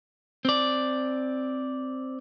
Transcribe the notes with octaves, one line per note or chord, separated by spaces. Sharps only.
C4 D5